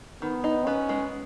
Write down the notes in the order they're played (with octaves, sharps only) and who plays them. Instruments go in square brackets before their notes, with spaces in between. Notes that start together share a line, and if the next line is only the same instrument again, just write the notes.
[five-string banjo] D#3 [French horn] B3
[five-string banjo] D#4
[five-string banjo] B3 [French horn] C#4
[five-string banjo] G#3